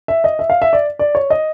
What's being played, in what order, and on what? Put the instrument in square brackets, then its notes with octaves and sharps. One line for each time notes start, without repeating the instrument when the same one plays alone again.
[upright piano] E5
D#5
E5
F5
E5
D5
D5
C#5
D#5